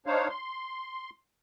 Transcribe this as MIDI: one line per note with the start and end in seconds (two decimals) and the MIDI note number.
0.06 0.28 62
0.06 0.28 63
0.06 0.28 72
0.06 0.28 73
0.06 0.28 77
0.29 1.10 84